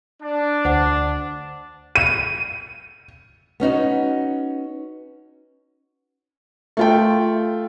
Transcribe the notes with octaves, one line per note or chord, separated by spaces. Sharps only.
D4
D2 C5 F#5 D6
D#7
B3 C#4 D#4 F#4
A3 F4 G5